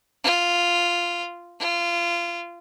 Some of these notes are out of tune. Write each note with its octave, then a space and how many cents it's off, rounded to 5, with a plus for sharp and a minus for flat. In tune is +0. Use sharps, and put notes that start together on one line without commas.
F4 -5
F4 -25